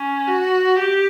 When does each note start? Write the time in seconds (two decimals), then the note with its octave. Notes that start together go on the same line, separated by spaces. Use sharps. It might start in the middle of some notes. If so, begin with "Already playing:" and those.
Already playing: C#4
0.27 F#4
0.79 G4